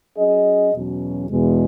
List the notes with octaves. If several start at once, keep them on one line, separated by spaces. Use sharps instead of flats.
F#3 C#4 G#4 D#5
E2 B2 F#3 C#4
E2 B2 G#3